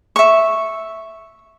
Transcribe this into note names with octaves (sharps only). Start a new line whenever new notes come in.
E5 C#6